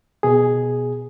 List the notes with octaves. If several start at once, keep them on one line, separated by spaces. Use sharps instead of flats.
B2 G#4